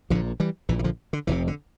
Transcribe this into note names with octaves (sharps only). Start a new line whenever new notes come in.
A#1 A#2 D3 F3
E3 G3
A#1 A#2 E3
E3
D3 F3
D3
F1 F2 C3 E3
D3